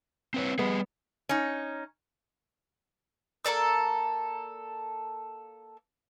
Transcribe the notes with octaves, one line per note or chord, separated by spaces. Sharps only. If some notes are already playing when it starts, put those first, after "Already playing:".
C4 B4 C#5
G3 B3 G#4
C#4 D#4
A#3 A4 D5 E6